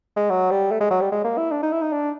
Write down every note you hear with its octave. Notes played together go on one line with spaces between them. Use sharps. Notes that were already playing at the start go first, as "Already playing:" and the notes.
G#3
F#3
G3
A3
G#3
F#3
G3
G#3
A#3
E4
D4
D#4
E4
D#4
D4